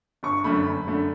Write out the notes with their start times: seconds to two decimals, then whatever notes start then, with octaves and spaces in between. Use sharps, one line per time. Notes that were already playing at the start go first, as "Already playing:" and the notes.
0.23 G1 C#6
0.44 F#2 D3 A3 B5
0.65 G1
0.87 F#2 D3 A3